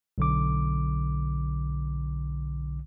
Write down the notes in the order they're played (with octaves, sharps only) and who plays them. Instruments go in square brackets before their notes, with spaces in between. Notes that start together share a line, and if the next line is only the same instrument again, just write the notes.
[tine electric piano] B1 D3 D6